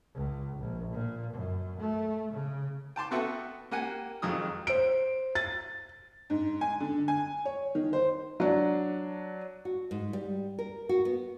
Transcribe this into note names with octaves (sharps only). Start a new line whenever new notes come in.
C#2
A#1
A#2
F#2
A3
C#3
G5 A5 C6 D6
B3 F#4 A4 B4 E5 G5
A#3 G4 F#5 G#5
F2 D#3 F#3 G#3 D#6 E6
C5 D7
A6
G#2
G#5
D3
G#5
C#5
D#3
C5
F#3 D4
F#4
G#2
G3
A#4
F#4
B3